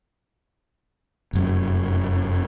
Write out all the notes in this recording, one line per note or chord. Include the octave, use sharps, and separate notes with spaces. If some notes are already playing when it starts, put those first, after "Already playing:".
F1 F#2